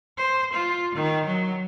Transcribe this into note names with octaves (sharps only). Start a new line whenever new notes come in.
C5
F4
D#3
F#3